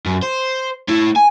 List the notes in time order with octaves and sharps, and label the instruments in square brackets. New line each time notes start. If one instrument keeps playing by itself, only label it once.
[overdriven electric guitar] F#2
C5
A2 E4
G#5